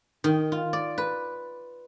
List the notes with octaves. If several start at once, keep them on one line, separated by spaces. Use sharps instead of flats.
D#3
F4
D5
B4